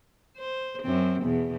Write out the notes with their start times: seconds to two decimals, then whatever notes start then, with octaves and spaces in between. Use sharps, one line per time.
0.37 C5
0.82 F#2 C4
1.23 E2 B2